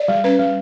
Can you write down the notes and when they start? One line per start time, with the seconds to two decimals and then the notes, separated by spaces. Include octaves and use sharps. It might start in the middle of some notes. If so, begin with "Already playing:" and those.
Already playing: D5
0.08 G3
0.24 C#4 B4
0.39 G3